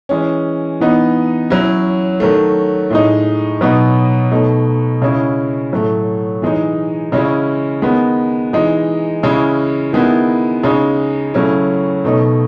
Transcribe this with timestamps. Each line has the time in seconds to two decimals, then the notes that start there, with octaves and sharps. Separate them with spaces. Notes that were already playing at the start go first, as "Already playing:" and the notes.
0.09 E3 G#3 C#4
0.80 E3 B3 D#4
1.50 F#3 C#4 E4
2.20 D#3 F#3 A3
2.90 A2 G#3 D#4
3.61 B2 F#3 B3 D#4
4.32 B2 A3 D#4
5.02 C#3 G#3 C#4 E4
5.72 A2 F#3 A3
6.42 E3 G#3 D#4
7.12 C#3 G#3 C#4 E4
7.82 D#3 G#3 B3
8.53 E3 G#3 D#4
9.23 C#3 G#3 C#4 E4
9.93 D#3 G#3 B3 E4
10.63 C#3 G#3 D#4
11.34 C#3 F#3 A3 C#4 E4
12.04 B2 A3 D#4